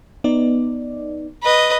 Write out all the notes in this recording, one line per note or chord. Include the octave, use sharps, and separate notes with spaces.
B3 D#4 D5
B4 D#5